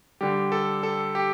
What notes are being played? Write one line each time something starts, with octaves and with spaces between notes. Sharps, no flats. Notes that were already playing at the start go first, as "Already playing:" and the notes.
D3 G3 G4
A4
A4
G4